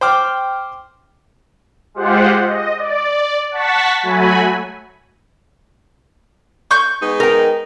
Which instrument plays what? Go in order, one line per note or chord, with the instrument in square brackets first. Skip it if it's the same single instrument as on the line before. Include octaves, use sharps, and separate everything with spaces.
[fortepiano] C5 G5 D6 F6
[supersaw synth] G#3 F4 G4 C5 F#5
D#5
D5
F#5 A5 C#6 A6 B6
F#3 A3 F#4 G#5 B5
[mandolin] C#6 G6
[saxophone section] G#3 B3 D#4
[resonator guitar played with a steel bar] A#4 G5